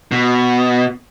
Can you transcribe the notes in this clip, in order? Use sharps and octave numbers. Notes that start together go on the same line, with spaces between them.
B2